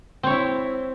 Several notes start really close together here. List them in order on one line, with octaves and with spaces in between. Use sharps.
C4 C#5 E4